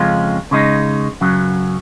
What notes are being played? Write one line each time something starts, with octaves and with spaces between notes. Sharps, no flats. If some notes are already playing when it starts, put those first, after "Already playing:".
Already playing: F2 C#3 G#3 C#4 F4
C#3 G#3 D#4
F#2 C#3 F#3